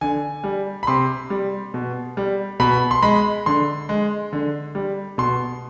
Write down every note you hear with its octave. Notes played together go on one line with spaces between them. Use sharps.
D3 G#5
G3
B5
C3 C6
G3
B2
G3
B2 B5
C6
G#3 B5
D3 C6
G#3
D3
G3
B2 C6